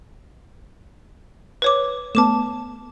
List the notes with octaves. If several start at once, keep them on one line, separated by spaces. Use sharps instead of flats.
B4 C#5 D6
A3 B3 A5 D6 E7